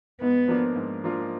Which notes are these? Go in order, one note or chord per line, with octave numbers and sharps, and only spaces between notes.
G#2 B3
F3 A#3 D4 F4
G#2
F3 A#3 D4 F4